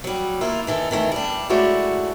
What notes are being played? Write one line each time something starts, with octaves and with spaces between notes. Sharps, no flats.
F#3 G3
A#3 E4 F4
D#3 E3 A4
D#3 E3 A3
G3 D4
G#3 A3 C#4 D4 E4 F#4